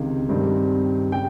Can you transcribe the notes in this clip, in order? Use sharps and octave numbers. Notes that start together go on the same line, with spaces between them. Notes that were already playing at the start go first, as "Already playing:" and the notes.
Already playing: C#2 C3 D#3
G2 D#3 G3 C4
C#3 G3 G5